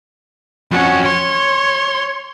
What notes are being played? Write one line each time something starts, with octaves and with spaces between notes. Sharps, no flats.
F2 C#4 F#4
C#5 C6